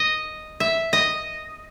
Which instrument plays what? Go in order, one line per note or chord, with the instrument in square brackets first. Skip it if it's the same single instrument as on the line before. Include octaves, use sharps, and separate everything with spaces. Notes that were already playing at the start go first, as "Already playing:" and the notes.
Already playing: [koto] D#5
E5
D#5